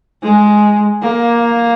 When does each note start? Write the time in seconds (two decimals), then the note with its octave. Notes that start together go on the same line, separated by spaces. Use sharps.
0.23 G#3
1.02 A#3